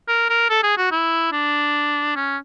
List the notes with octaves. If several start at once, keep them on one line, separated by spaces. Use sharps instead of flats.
A#4
A#4
A4
G#4
F#4
E4
D4
C#4